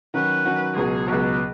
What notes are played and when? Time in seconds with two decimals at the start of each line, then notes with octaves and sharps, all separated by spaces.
0.14 D#3 F#3 C#4 F#4 B4
0.45 D#3 F#3 C#4 F#4
0.76 C#2 B2 F#3 G#4
1.08 C#2 B2 F#3 B4